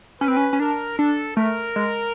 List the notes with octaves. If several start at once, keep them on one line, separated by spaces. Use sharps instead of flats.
C#4 B4
C4
C#4
C#4
D4 A#4
D4 A4
A3 A#4
G#3